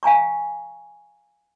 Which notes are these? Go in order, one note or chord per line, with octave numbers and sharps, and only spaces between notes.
F5 G#5 A#5 C#6